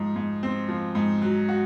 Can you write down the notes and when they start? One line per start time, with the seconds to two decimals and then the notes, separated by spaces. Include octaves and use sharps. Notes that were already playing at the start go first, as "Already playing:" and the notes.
Already playing: G#2 F3
0.16 G#2
0.43 C4
0.69 F3
0.95 G#2
1.22 F#3
1.49 F#4